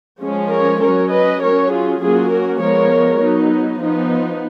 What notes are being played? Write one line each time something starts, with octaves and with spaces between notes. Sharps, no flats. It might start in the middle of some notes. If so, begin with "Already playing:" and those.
F3 G#3 C#4
A#4 C#5
F#3 C#4 A#4 C#5
B4 D#5
F#3 C#4 A#4 C#5
F4 G#4
F#3 A#3 C#4 F4 G#4
F#4 A#4
F3 G#3 B3 A#4 C#5
F#3 B3 D#4
F3 B3 D#4